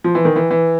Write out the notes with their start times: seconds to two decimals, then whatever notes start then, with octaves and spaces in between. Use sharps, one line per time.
0.04 F3
0.15 E3
0.25 D#3
0.36 E3
0.51 E3